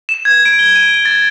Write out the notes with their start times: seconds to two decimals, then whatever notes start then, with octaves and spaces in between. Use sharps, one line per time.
0.09 E7
0.25 G#6
0.45 D7
0.59 G7
0.76 D#7
1.05 A6